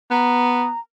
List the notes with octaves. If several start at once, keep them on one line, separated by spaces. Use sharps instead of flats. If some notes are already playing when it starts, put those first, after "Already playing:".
B3 A#5